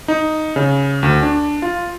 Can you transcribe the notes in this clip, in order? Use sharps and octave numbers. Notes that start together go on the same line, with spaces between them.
D#4
C#3
D2
D4
F4